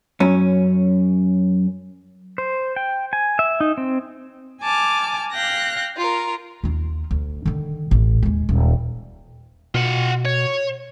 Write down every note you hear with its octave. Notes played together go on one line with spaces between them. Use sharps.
F#2 C#4
C5
G5
G#5
E5
D#4
C4
G#5 A5 D6 F6
F5 G5 F#6 A#6
F4 A#4
D#2 F4
D2
D3 D#3
A1
D#2 G#3
D#1
B2 F4 F#5
C#5